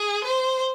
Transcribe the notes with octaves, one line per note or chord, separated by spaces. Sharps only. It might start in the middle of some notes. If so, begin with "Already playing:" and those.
Already playing: G#4
C5